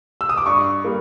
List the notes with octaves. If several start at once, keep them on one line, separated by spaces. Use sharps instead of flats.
E6
D#6
D6
G2 C#6
G3 A#3